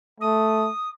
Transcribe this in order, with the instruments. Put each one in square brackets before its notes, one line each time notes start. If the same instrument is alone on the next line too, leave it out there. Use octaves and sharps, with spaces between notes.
[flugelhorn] A3 [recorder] D#6